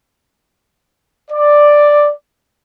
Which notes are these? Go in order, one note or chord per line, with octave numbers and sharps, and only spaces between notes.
D5